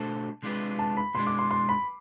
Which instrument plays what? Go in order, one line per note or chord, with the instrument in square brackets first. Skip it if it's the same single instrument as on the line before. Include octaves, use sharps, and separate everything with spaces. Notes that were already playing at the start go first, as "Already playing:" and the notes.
Already playing: [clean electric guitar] B2 A3 D4 A4 C5 [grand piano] A5
[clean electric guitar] C3 G#3 D4 F4 B4
[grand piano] A5
B5
[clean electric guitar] B2 G#3 D4 [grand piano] C6
[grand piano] D6
C6
C6
B5